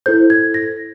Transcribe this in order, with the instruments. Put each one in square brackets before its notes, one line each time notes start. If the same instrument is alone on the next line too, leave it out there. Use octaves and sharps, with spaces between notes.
[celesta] E4 A4 C5 G6
G#6
A#6